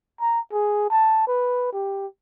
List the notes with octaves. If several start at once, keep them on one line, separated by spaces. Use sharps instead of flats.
A#5
G#4
A5
B4
G4